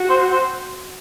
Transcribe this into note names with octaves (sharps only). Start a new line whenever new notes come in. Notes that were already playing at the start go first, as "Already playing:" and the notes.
Already playing: F#4
C5
C5